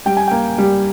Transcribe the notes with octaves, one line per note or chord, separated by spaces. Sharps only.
G3 G5
G#5
A#3 G5
G3